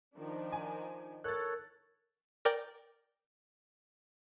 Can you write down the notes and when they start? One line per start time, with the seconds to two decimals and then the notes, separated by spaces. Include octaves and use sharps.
0.14 D#3 F3 D4
0.52 G#5
1.24 A4 A#4 C#5 F#6 A6
2.45 A#4 D5 G5